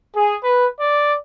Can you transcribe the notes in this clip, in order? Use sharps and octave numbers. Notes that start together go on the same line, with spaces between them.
G#4
B4
D5